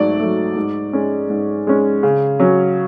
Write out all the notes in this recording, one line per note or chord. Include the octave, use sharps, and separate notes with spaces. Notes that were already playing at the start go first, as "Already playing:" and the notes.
Already playing: G#2 F#3 A3 D5
F#3 A3
G#2
G#3 C#4
G#2
G#3 C#4
C#3
F#3 C#4